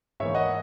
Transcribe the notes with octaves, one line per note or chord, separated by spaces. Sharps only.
G#2 E3 A#3 C#5 E5
D#5 F#5